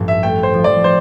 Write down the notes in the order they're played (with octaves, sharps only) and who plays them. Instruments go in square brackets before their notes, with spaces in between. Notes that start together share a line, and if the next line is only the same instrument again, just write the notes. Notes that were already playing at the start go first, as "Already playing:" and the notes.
Already playing: [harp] A1 G2 F3
[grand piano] E5
[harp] A3 [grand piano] G5
[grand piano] C5
[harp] F3
[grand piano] D5
C5